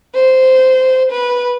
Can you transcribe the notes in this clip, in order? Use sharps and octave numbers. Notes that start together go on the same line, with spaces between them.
C5
B4